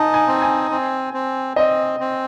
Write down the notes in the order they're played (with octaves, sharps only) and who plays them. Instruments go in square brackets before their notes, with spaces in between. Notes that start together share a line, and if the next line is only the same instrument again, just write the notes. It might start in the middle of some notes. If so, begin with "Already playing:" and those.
Already playing: [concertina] D#4 [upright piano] G#5 A5
[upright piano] G#5
[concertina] C4
[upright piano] G#5
[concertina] C4
C4
[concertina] C4 [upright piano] D#5
[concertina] C4